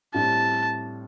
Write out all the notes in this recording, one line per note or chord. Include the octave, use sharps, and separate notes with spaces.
A2 G3 C4 A5